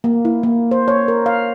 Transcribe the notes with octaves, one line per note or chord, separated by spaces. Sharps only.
A#3
E4
A#3
C5
C#5
A#4
F5